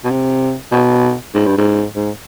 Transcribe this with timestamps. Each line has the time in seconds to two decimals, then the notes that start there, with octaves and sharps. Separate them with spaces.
0.04 B2
0.11 C3
0.72 B2
1.35 G#2
1.46 G2
1.58 G#2
1.96 G#2